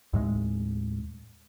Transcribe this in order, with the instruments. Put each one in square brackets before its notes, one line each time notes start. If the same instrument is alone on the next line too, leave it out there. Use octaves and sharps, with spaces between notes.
[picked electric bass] D#2 A2 G#3